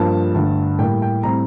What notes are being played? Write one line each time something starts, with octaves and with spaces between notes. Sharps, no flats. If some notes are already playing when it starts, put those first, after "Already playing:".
Already playing: G2 F3 A#3 A5
G2 D3 A3
A2 G3 A#3 G5
G5
A2 G3 C4 A#5